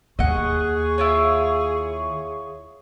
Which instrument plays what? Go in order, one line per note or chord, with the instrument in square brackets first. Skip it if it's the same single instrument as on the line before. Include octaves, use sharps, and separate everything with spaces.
[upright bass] D#2 [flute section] G#4 C#6 [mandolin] D#5 F#5
[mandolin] E4 F4 C#5